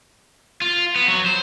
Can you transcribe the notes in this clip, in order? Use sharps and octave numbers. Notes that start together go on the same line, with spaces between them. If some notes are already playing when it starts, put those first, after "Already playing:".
F4
B3
F#3
C5